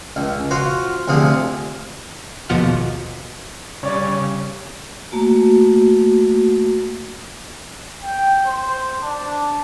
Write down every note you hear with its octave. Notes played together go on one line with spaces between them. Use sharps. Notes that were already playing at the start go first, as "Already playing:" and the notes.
C#2
F4 F#4 C5
D2 C3 F3 G#4
G#1 D#2 B2 F3 F#5 F6
C#3 G3 C#5 D5
A3 A#3 F#4
G5
C5
D4